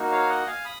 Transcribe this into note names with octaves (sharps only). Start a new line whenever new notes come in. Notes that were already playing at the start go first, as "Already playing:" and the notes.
Already playing: A#3 D#4 F#4
C#5 F5
D#5 F#5
F5 G#5
B5 D#6